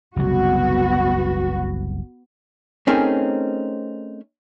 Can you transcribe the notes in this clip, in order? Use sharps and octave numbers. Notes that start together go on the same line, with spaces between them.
F#1 C2 B3 F#4
A3 C4 C#4 D#4 G#4 A#4